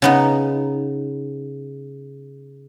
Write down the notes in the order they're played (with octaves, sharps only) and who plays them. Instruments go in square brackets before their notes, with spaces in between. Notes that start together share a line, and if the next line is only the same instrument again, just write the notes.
[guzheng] C#3 B3 D#4